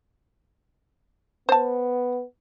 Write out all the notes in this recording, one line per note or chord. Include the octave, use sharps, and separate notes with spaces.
B3 C5 A5